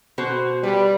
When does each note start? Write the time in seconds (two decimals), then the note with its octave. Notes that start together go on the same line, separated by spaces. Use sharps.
0.18 B2 F#4 C5
0.63 G3 B4